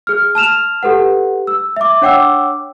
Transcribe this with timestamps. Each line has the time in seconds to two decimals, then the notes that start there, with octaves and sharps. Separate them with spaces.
0.07 G#4 F6
0.35 A5 F6 E7 F7
0.83 G4 A4 B4 F#5
1.47 E6
1.76 E5 D6
2.02 D4 C#5 F#5 G5 D6 E6